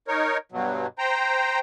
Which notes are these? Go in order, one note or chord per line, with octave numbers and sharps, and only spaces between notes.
D#4 A#4 C#5
G2 B2 F#3
C5 G5 A#5